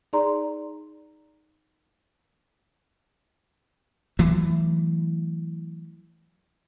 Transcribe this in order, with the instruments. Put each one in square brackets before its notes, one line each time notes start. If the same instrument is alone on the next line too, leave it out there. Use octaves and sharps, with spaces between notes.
[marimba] D#4 G#4 D5 A#5 C6
[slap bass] E3 F#3 A3